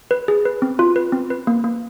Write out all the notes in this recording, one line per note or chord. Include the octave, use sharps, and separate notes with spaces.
B4
G#4
B4
C4
F4
B4
C4
B4
A#3
A#3